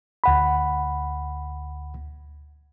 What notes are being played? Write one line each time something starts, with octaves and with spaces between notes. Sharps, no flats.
D2 F#5 B5